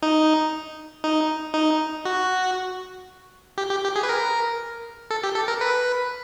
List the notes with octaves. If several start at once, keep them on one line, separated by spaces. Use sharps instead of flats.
D#4
D#4
D#4
F#4
G4
G4
G4
G#4
B4
A#4
A4
G4
A4
A#4
B4